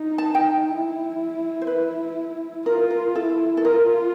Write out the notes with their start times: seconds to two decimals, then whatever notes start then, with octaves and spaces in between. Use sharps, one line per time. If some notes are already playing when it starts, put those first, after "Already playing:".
Already playing: D#4
0.18 A5
0.35 G5
0.68 E4
1.61 C5
1.67 B4
2.66 F4 A#4
2.90 A#4
3.15 E4 A4
3.57 A4
3.65 F4 A#4